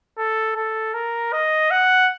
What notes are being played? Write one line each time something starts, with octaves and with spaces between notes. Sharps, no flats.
A4
A4
A#4
D#5
F#5